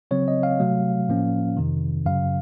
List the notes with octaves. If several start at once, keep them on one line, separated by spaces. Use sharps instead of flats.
C#3 F#3 C4 C#5
D#5
F5
C3 F#3 A3
A2 F3 A#3 C#4
F2 C3 D#3
F#2 C#3 F#3 F5